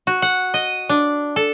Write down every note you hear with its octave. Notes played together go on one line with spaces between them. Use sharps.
F#4
F#5
D#5
D4
A4